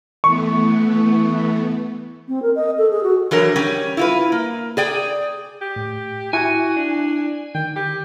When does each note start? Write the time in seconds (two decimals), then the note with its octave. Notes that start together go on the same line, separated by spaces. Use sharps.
0.24 E3 A3 B3 C#6
2.28 C4
2.42 A#4
2.56 D#5
2.77 A4
2.91 G#4
3.03 F#4
3.31 E3 F#3 D4 A#4
3.56 G3 C#4
3.97 E4 F4 B4
4.32 A#3
4.77 G#4 D5 G5
5.62 G4
5.76 A2
6.33 E4 F#4 G#5
6.76 D4
7.55 D#3 G5
7.76 G4